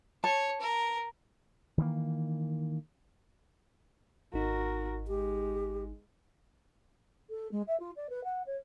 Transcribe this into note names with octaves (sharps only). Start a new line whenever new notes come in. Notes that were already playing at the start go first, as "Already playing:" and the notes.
C#5 A5
A#4
D#3 E3 G3 A#3
G#1 D#4 F#4 A#4
G#3 G4
A4
G#3
E5
F4
D5
B4
F#5
C#5